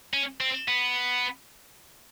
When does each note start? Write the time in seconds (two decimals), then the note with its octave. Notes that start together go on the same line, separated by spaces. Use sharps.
0.13 C#4
0.40 C4
0.68 B3